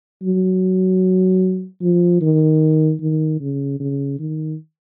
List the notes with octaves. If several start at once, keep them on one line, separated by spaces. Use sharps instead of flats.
F#3
F3
D#3
D#3
C#3
C#3
D#3